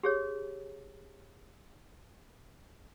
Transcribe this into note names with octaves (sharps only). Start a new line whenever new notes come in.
G4 G#4 C#5